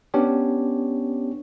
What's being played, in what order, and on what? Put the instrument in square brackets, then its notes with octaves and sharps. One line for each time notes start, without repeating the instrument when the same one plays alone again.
[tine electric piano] B3 C#4 D4 G4 C#5